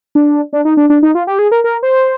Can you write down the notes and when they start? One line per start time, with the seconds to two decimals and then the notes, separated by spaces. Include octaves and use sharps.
0.15 D4
0.53 D4
0.65 D#4
0.77 D4
0.90 D4
1.03 D#4
1.15 F4
1.27 G4
1.39 G#4
1.52 A#4
1.64 A#4
1.83 C5